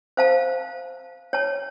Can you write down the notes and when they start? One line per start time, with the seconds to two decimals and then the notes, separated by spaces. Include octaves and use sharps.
0.17 C5 F5 A5
1.33 C#5 A5